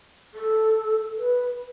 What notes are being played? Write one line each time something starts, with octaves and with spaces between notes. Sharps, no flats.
A4
B4